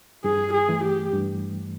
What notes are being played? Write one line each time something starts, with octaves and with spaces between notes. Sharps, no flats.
G2 G#4
G#4
E3 A3
G4
G2